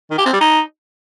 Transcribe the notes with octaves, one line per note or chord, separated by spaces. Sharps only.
D#3
G4
C4
G3
D#4